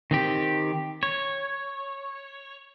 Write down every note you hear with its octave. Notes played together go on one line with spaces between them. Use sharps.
D#3 C4 G4
C#5